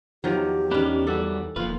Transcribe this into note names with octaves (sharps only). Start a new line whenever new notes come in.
E2 D#3 F3 F#3 G4
D#3 C#4 D4 B4
G3 F#4 A4
E1 F3 A#3 F4 B4